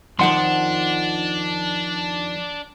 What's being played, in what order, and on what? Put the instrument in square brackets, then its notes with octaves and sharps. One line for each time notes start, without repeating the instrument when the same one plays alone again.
[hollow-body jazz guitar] F2 D#3 F3 [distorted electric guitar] D4 [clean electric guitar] F#5 C6